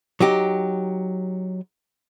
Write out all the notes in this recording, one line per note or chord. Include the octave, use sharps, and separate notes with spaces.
F#3 D#4 G4